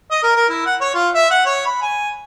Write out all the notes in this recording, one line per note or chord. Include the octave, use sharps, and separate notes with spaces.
D#5
A#4
A#4
E4
F#5
C#5
F4
E5
F#5
C#5
B5
G#5